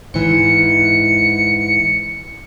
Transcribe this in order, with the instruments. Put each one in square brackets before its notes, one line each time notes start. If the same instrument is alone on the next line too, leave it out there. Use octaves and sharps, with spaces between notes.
[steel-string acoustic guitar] G#2 E3 [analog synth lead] C#7